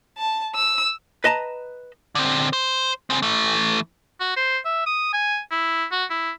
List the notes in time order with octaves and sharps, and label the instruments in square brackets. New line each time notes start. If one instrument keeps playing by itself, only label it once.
[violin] A5
E6
[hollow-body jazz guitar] B4 D#5 A5 A#5
[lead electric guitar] D3 C4
C5
C#3 C4
E3 A3
[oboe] F#4
C5
E5
D#6
G#5
E4
F#4
E4